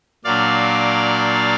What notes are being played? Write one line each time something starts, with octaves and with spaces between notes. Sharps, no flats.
A#2 F#3 A#3 D4 D5 F5